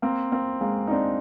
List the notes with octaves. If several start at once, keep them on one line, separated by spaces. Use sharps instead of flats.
A#3 C4
A#3 C4
G#3 A#3
D#4
C4 D4